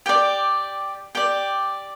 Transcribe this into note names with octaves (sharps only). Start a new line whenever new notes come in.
G4 D5 G5
G4 D5 G5